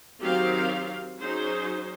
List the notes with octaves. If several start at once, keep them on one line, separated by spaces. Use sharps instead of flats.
D#3 F#3 C4 G4 C5 F5
F#3 C#4 D#4 G#4 C5